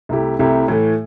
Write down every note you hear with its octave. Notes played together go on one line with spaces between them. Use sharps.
C2 C3 A3 E4 G4
C2 C3 A3 E4 G4
A2 E3 A3